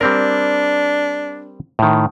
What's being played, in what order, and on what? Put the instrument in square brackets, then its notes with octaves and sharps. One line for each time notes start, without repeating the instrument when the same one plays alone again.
[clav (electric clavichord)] G3 C4 A#4 [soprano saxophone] D4
[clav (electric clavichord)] A2 D#3